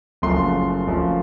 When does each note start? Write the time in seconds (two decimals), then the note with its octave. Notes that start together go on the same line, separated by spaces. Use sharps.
0.22 F#1 F#2 F3 A3 C6
0.87 F#1 F#2 F3 A3